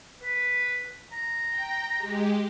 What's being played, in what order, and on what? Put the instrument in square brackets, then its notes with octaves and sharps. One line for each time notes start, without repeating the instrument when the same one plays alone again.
[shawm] B4
A#5
[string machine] G5
G#3 G4